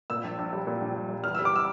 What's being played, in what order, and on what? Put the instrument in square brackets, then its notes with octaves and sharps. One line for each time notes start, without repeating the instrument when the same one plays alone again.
[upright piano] A#2 E6
A#1
A#1
G3
A#2
A#1
A#1
G3
E2 F6
G3 E6
D6
E6